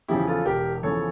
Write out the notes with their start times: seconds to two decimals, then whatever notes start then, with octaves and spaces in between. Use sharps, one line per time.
0.08 E2 C#3 F3 E4 G4
0.28 F4 A4
0.46 E1 G4 A#4
0.83 E2 C#3 F3 A4 C#5